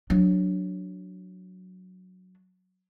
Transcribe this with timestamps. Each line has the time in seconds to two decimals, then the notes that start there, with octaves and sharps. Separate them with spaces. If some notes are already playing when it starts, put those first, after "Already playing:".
0.10 F#3 D4